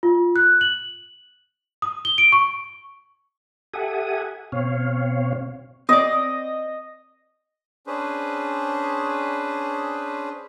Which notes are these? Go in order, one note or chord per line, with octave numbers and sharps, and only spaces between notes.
F4
F#6
F#7
D#6
G7
D7
C#6
G4 A4 E5 F#5 G#5 D#6
B2 C4 C#5 F5
C4 D5 D#5
C#4 D4 G#4 B4 C5